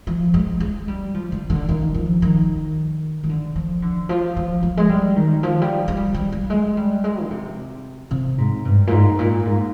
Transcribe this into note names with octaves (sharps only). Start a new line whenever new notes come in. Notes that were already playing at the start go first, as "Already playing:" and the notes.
F3
G#3
G#3
G3
F3
D3
D3
D#3
F3
D#3
D#3
D3
F3
D3
F3
F3
F3
G#3
G3
D#3
F3
G3
G#3
G3
G3
G3
G#3
G3
G#3
D3
C3
C3
G#2
G2
A#2
G#2
A#2
G#2